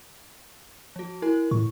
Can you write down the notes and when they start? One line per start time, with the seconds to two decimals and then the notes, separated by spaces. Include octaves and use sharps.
0.96 F3 F#4
1.22 E4 A#4 G#5
1.51 A2 C#6